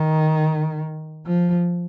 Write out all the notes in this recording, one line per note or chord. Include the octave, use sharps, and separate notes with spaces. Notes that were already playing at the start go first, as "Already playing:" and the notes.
Already playing: D#3
F3